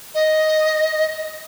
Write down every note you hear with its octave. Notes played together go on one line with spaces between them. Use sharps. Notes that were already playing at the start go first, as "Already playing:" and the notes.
D#5